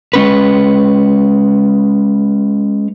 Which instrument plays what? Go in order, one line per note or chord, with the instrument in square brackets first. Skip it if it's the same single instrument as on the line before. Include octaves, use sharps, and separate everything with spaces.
[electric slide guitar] G#3 C#4 B4